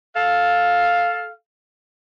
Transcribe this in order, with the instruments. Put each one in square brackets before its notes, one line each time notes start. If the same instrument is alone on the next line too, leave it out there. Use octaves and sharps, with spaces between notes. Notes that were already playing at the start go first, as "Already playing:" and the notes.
[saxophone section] A4 F5